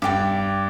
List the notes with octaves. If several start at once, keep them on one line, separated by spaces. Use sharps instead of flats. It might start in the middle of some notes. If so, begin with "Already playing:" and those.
G2 D5 G5 D6